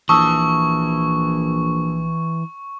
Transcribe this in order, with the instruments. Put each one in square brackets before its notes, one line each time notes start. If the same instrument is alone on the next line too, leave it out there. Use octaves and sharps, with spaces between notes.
[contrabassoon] A#1 [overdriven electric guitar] E3 [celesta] A5 D#6 E6 [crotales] C#6